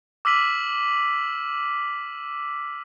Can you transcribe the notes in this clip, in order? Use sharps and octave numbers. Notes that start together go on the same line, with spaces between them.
D6 E6 F6 B6 D#7 F#7